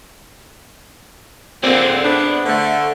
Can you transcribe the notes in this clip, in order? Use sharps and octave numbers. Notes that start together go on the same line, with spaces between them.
A#2 D3 C4 G#4 C5 D5
B3 D4
D3 A3